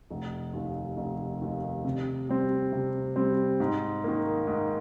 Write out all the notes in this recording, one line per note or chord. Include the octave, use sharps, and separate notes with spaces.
F1
D#2 D#3
F1
D#2 D#3
C3
G3 C4
C3
G3 C4
G#2
D#3 A#3
G#2